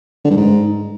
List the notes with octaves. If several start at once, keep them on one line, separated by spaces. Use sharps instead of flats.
D3
G2
G#2